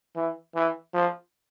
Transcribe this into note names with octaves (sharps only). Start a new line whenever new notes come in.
E3
E3
F3